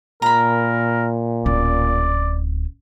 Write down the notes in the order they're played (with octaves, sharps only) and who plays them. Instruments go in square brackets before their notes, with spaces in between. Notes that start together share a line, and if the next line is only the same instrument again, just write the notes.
[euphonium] A#2 [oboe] A#4 [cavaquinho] A#5 B5
[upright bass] D1 C#4 [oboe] D5